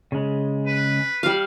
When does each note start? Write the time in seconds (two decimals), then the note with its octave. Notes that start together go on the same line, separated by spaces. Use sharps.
0.12 C#3 G#3
0.67 B4
1.23 G3 F5